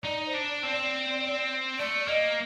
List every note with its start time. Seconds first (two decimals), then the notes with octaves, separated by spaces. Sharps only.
0.04 D#4 D5
0.26 C5
0.34 D4
0.48 D5
0.63 C4
0.70 D5
1.78 A3 D5
2.08 A#3 D#5